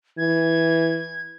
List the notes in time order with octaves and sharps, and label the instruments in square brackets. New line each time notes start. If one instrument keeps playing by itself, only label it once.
[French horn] E3 [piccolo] G#6